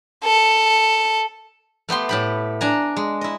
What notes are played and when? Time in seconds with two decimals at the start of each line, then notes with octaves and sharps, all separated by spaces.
0.24 A4
1.89 A3 B3 G4 C6
2.09 A2 G4 B5
2.61 D4 G#5 A#5
2.97 G#3
3.21 E4 D#5